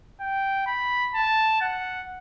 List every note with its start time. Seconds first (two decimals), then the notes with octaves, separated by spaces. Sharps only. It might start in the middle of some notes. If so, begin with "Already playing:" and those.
0.21 G5
0.67 B5
1.15 A5
1.61 F#5